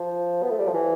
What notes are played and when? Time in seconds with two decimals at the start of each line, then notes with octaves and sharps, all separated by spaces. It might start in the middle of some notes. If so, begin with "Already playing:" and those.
Already playing: F3
0.42 B3
0.50 A3
0.59 G3
0.67 F3
0.74 E3